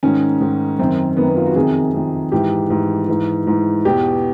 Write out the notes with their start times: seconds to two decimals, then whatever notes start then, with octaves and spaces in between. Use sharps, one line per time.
0.03 G#2 D#3 C#4
0.41 G#2 D#3
0.79 F#2 D#3 C4
1.17 F#2 D#3 B3
1.28 B3
1.36 F4
1.46 F#4
1.56 F2 C3 D#3 G#4
1.94 F2 C3 D#3
2.32 G#2 E3 G4
2.70 G#2 E3
3.08 G#2 E3
3.47 G#2 E3
3.85 E2 B2 G4